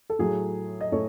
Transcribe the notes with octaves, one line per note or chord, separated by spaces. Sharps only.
A4
A2 F#3 A3 G#4
D#5
A2 A4 C#5